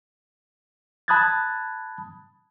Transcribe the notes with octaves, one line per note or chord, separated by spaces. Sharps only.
A5 B5 D#6 F#6 G#6 A6